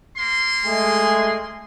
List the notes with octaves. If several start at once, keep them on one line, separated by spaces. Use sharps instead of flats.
A#3 C6
G#3 A3 G#4